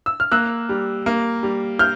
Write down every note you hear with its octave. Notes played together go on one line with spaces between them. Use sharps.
E6
F6
A#3 E6 F#6
G3
A#3
G3
F6 G6